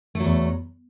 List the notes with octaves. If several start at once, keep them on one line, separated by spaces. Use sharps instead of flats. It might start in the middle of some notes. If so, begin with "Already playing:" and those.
E2 F#3 A3